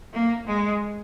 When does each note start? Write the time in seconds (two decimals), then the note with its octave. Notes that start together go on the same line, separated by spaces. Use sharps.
0.13 A#3
0.47 G#3